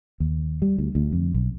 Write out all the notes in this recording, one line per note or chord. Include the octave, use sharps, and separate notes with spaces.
D#2
G3
D2
D2
F2
B1